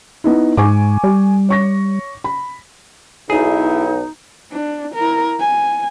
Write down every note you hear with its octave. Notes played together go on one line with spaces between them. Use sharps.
B3 D#4 E4
G#2 G#5 C#6 D6
G3
C#5 C#6 A#6
B5
B1 D#4 E4 G#4
D4
E4 A#4
G#5